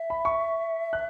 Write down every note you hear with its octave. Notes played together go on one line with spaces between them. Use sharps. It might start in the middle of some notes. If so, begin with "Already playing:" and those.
Already playing: E5
B5
C#6
F#6